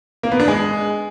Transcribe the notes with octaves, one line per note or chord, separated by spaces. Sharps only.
A#3
B3
D4
G#3